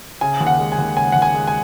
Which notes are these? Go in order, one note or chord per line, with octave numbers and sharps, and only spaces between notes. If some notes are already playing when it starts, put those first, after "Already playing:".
C#3 G#5
D#2
F#5
G#3
G#5
D#2
C#3 G#5
D#2 F#5
G#5
G#3
G#5